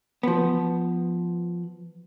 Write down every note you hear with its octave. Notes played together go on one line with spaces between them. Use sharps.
F3 B3